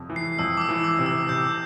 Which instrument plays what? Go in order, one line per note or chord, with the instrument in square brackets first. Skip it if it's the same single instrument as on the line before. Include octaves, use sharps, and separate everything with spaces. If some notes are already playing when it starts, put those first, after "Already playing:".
Already playing: [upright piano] F2 C3
E3
[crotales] C7
[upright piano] F2 [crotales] E6
[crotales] D6
E6
[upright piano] E3
[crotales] D6
[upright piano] C3
[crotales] E6
[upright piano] C3 [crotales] G6